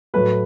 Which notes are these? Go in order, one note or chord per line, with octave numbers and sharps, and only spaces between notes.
A2 F#3 A3 B4